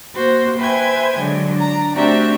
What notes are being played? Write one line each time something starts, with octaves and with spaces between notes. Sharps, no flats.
A#3 F#4 C5
B4 C5 E5 G5 G#5 G#6
D3 F#3 G#3
D4 A#5
A3 C4 D4 F#4 G4 E5